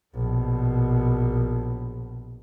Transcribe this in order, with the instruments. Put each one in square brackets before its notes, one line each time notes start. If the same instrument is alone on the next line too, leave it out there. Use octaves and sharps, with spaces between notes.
[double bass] A#1 B2